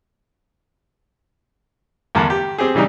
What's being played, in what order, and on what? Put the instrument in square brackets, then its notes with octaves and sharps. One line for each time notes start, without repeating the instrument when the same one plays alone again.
[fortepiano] E2 G2 D3 A#4 A5
G4
C4 G4 G#4
C#3 E3 G3 D4 D#4